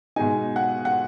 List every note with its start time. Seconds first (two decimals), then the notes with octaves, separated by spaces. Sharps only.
0.16 B2 G#3 D#4 G#5
0.56 F#5
0.85 F#5